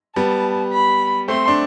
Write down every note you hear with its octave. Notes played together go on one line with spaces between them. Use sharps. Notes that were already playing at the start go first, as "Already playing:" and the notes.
G3 B3 A5
B5
A3 C4 C6
D4